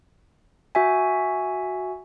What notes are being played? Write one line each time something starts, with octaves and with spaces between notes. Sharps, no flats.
F#4 E5 G#5